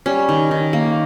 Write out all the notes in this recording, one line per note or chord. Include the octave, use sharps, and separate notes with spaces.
G3 C#4
D#3
D#3
A#3